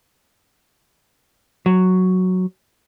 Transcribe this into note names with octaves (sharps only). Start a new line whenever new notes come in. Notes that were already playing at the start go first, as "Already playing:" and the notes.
F#3